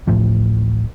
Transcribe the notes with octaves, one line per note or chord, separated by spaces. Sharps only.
D1 A1 A2 F3